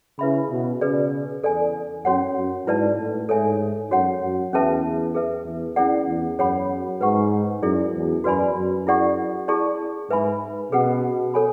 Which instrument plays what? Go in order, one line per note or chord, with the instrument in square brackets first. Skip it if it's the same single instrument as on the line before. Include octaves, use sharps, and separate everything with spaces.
[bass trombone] C#3 [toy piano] E4 B4 E5 B5
[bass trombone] B2
[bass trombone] C#3 [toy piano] G#4 B4 D5
[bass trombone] E2 [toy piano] A4 D5 G#5
[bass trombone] F#2 [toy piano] C#4 F#4 C#5 F#5
[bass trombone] F#2
[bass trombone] G#2 [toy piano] E4 B4 D5 A5
[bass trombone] A2
[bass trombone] G#2 [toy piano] A4 C#5 E5 G#5
[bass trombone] F#2 [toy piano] F#4 C#5 F#5
[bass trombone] F#2
[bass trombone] E2 [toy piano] C#4 G#4 B4 E5 A5
[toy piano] G#4 B4 E5
[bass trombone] E2
[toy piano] C#4 E4 G#4 D5 F#5
[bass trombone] E2
[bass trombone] F#2 [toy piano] G#4 C#5 F#5 B5
[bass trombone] G#2 [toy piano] B4 F#5 C#6
[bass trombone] F#2 [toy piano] E4 G#4 D5
[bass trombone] E2
[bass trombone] F#2 [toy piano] F#4 B4 D5 G#5 B5
[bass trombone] F#2
[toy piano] E4 G#4 D5 F#5 C#6
E4 G#4 D5 A5 C#6
[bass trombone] G#2 [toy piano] B4 E5 G#5 B5
[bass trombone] B2 [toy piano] C#4 G#4 B4 F#5
[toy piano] A4 C#5 G#5 B5